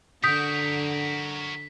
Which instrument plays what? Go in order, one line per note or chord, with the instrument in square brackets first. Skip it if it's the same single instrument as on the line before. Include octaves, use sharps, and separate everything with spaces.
[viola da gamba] D3 [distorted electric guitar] F#4 A#4 [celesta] D#6 G6 [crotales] B6